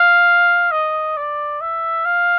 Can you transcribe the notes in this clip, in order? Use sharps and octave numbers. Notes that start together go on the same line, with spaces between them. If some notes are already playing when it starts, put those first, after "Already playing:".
Already playing: F5
D#5
D5
E5
F5